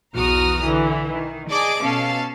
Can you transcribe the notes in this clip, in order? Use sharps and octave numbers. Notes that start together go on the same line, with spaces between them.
B1 E2 F#4 A#5 D#6 F6
D3 E3
D#3
G#4 D5 D#5 A5 D6
B2 C#4 A4 F5 A5